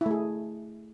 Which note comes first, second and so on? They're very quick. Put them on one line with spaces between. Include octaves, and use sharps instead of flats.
E4 A3 G#4